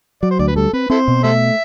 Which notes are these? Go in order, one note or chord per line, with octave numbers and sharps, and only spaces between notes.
F#3 D5
C5
D2 D5
B4
G3 A4
C4 B4
C4 E4 A4 C5
B2
A3 A4 C5 E5